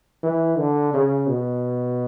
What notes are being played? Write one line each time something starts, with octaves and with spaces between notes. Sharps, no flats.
E3
D3
C#3
B2